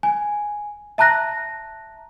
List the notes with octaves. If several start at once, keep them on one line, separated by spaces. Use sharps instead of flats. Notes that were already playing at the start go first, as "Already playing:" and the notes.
G#5
E5 A5 A#5 F#6 A#6